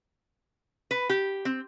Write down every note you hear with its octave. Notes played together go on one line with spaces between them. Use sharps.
B4
G4
C4